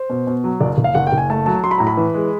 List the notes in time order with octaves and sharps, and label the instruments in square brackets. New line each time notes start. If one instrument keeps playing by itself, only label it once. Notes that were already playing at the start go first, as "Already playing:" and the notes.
Already playing: [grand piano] C5
B2
B2
F#3
F#1 D5
F#1
F5
F#1 F#5
G5
F#1
G#5
A3 A5
F#3 A5
F#3 C6
B5
A2 A#5
B5
E3
G#3